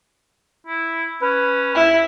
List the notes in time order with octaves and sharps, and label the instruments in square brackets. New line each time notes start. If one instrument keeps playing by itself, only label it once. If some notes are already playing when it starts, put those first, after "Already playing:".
[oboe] E4
[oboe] C#4 [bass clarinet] B4
[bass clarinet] D#2 [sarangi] E4